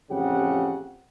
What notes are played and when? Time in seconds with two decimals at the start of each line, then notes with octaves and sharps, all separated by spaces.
0.11 A1 F2 C#3 G4 F#5